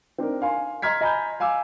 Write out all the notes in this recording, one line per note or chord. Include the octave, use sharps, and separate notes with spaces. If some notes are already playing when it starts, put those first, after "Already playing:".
C4 D4 D#4 A#4
F5 G#5 C6
D#5 A#5 C6 F6 G#6 B6
D#5 G#5 A#5 B5 G6
F5 G#5 D6 E6